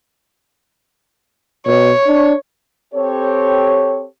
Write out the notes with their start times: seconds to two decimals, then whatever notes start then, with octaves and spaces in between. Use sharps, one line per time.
1.66 B2 C#5
2.07 D4
2.94 C4 G4 A4 C#5